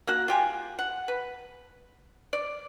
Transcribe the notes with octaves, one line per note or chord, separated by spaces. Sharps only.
A#3 F#4 F#5
F4 G4 G#5
F#5
B4
D5